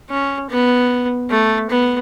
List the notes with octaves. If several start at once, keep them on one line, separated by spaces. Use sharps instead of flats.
C#4
B3
A3
B3